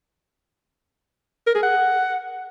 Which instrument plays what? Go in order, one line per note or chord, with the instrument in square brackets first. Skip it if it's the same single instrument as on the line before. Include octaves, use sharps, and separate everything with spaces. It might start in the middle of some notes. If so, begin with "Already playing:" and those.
[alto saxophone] A#4
G#4
F#5